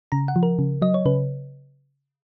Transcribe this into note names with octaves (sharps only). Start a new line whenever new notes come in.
C#3 A#5
F#5
F3
A#4
C#3
F#3 D#5
C#5
C#3 B4